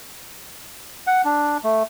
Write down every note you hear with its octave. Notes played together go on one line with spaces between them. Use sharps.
F#5
D4
A3